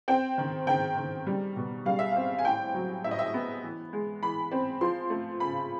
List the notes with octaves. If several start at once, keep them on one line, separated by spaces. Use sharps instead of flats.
C4 G5
D#3
D#3 G5
D#3
G3
B2
G3 F5
E5
C4 F5
G#5
A2 G5
F#3
A2 E5
D#5
E5
B3
E3
G#3
E3 B5
C4
F3 C6
A3
C#3 B5